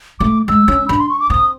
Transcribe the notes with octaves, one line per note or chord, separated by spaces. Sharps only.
A3 D6
G#3 E6
C#4
D4 B5
C6
C#6
D6
C4 D#6